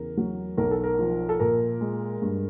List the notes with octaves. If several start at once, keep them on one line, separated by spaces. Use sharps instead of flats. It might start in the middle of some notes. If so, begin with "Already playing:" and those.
Already playing: E2 C#3 A#4
F#3
B1 A#4
A4
A#4
F3
A4
A#2 A#4
G#3
G2